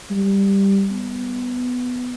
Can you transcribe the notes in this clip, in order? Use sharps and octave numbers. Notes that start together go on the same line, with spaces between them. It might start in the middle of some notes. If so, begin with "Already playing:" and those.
G3
B3